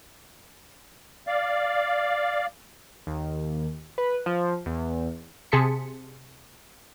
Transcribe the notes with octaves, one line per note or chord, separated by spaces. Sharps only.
D5 F5
D#2
B4
F3
E2
C3 G#4 A5 C6 B6 C#7